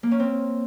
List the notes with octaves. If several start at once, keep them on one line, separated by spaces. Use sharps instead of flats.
A#3
C#4
C4